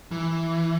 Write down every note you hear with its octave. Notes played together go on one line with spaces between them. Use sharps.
E3